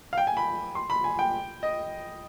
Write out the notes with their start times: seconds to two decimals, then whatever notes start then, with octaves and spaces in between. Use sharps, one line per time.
0.13 F5
0.18 G5
0.27 G#5
0.37 B5
0.75 C6
0.90 B5
1.04 G#5
1.19 G5
1.63 D#5